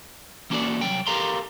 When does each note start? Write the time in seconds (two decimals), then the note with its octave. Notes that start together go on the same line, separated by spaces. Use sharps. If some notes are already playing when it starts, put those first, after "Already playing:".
0.50 E3 A#3 C#4 F#4 A4 D5
0.81 C2 F#3 G5
1.07 G4 A4 A#4 F5 A#5 C6